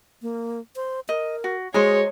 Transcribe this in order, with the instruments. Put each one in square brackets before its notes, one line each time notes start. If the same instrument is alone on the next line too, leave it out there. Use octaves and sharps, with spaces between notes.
[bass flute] A#3
C5
[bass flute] A#4 [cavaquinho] D#5
[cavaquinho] F#4
[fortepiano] G#3 [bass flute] F#4 [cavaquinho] C5 D#5 A#5 [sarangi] C#5